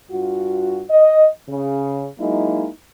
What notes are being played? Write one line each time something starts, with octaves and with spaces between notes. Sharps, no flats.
G2 F4 F#4
D#5
C#3
F#3 G#3 A#3 D#4 E4